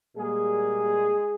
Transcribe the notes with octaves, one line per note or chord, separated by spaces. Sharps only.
A#2 G3 G#3 A#3 G#4